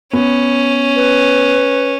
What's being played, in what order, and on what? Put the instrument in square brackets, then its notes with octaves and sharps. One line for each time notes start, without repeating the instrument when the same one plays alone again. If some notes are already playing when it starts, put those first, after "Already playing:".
[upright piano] B3 [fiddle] C#4
[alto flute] B4